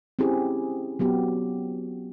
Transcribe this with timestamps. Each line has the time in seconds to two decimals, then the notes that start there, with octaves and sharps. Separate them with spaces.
0.19 C4 C#4 E4 G4 G#4
0.99 F#3 B3 F#4 G4